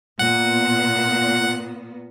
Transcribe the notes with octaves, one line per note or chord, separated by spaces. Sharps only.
A#2 B3 F#5